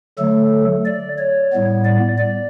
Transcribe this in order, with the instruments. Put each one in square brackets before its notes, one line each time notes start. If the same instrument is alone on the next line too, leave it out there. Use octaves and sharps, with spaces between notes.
[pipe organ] D3 F#3 A3 A4
D5
C#5
A2 G3 B3
D5
D5